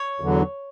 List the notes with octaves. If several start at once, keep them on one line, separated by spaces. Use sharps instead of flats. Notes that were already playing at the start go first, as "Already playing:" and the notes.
Already playing: C#5
E2 D3 F#3